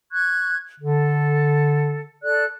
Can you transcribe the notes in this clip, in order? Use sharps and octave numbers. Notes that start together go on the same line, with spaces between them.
C#6 F#6 G#6
D3 A4
A4 D5 F#6